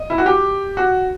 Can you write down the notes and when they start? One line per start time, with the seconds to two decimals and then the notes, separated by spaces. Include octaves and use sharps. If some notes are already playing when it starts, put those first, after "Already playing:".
Already playing: D#5
0.10 E4
0.18 F#4
0.26 G4
0.77 F#4